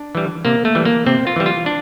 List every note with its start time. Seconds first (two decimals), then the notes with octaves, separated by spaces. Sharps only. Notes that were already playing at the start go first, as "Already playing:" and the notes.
Already playing: D4
0.15 E3 G3
0.45 C3 A#3
0.65 A3
0.75 E3 G3
0.85 A#3
1.06 C3 C4
1.27 F4
1.36 E3 G3
1.46 F4
1.66 D4